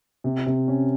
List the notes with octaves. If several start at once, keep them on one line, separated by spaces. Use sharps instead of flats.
C3
C3
C#4